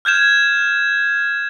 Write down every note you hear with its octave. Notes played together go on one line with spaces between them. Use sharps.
F6 G6 G#6 E7